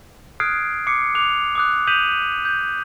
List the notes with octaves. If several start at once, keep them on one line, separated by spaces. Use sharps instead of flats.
D#6 F6 F#6 G#6 C7 D7
D6 C7 C#7
D6 F#6 F7
D6 D#6 F#6
D#6 G6 B6 D#7 F7 F#7
G6